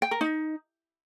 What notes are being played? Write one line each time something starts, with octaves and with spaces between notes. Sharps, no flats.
G5
A#4
D#4